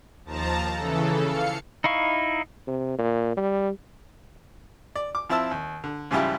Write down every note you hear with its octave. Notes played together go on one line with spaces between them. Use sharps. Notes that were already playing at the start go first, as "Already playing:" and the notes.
D#2 F3 A5 A#5
C#3 E3 A4
F5 C#7
D#4 E4 F5 C#6
C3
A#2
G3
D5
D6
F3 C4 E4 C5 A5 E6
D#2
D3
G#2 C#3 F3 G3 E4 G4